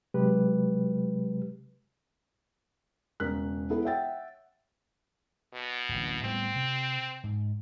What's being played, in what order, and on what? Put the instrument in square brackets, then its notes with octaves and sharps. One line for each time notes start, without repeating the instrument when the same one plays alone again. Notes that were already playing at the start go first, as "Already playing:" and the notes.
[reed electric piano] C3 F#3 G#3 G4 B4
[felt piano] E1 C#3 A#4 F#6 B6
B3 E4 A4
C#5 E5 F#5 G5 A6
[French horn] B2
[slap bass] D1 A1
[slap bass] A2 G3 B3 [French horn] C4
[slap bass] C3
G#2